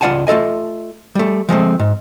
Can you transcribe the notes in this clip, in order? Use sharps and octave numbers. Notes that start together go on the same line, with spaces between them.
C#2 F4 D5 F#5 G#5 A5
A3 F4 A4 D#5 G#5
G3 A3
F3 G#3 A3 C4
G#2